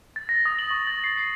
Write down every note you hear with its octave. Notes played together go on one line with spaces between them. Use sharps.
A6
A#6
D#6
F#7
C#6
A6
C7
C7